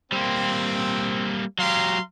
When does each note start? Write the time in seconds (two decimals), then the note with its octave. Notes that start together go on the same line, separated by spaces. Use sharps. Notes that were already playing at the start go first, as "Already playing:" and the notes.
0.12 G3 A#3 C4
1.59 F#3 G4 F5 A#5 C6